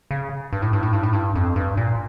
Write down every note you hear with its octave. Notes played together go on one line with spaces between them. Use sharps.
C#3
G2
A2
G2
A2
G2
A2
G2
F2
G2
A#2